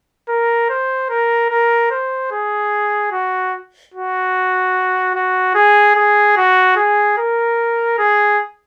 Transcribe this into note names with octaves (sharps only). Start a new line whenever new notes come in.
A#4
C5
A#4
A#4
C5
G#4
F#4
F#4
F#4
G#4
G#4
F#4
G#4
A#4
G#4